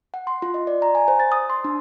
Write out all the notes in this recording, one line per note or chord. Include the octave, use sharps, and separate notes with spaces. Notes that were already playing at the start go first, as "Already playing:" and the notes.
F#5
C6
F4
D#5
D5
A#5
G#5
C5
A6
D#6
C6
D4